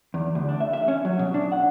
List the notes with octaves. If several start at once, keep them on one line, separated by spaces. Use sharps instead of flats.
E2
D2
D4
E5
E5
C#4
F#3
B2
D4
F#5